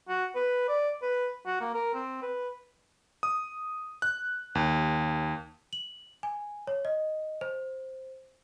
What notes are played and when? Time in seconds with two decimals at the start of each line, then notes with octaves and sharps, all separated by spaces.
0.09 F#4
0.35 B4
0.69 D5
1.02 B4
1.46 F#4
1.61 A#3
1.75 A#4
1.94 C4
2.22 B4
3.23 D#6
4.02 F#6
4.55 D#2
5.73 F#7
6.23 G#5
6.67 C#5
6.85 D#5
7.41 C5